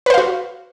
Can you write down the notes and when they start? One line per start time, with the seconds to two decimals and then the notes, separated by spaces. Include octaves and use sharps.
0.06 B4
0.10 C5
0.14 F5
0.18 F#4